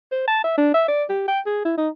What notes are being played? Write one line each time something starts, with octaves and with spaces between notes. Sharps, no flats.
C5
A5
E5
D4
E5
D5
G4
G5
G#4
E4
D#4